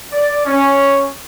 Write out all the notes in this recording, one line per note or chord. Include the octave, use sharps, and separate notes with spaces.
D5
C#4